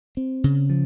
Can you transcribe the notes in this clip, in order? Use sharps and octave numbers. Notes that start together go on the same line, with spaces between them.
C4
C#3
F3